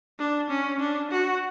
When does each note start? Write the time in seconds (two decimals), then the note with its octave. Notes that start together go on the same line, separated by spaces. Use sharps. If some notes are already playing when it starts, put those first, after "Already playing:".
0.19 D4
0.50 C#4
0.80 D4
1.11 F#4